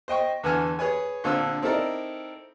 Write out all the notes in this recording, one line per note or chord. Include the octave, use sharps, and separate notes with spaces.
C5 D#5 G5 C#6
E2 D3 B4 F#5 G#5 F6
G#4 B4 C#5 G#5
A#1 D3 C4 F4 E6
C4 D#4 E4 A4 A#4 D5